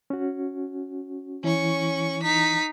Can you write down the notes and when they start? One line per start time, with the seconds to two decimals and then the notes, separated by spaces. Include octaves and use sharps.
0.10 C#4 F#4
1.44 E3 C#4 E4 C#6
2.23 D#4 B6